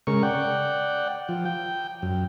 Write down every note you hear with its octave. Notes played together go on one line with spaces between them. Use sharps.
C#3 G#3 A#4 C#6
D5 F#5 G5
F3
G5
F#2